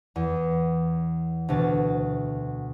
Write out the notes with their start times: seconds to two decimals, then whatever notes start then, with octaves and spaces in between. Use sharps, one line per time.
0.16 E2
1.49 D2 B2 A6